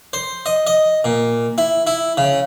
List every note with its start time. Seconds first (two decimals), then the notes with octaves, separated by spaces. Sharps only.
0.13 C5
0.46 D#5
0.67 D#5
1.04 A#2
1.58 E4
1.87 E4
2.17 C#3